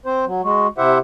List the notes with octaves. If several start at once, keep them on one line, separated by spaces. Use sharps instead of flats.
C4 C5
F#3
G#3 F#4
C3 E4 G4 C5 E5 F#5